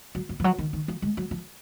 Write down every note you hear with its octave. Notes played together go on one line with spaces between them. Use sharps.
F#3
F#3
F3
F#3
D#3
D#3
F3
G#3
F#3
F3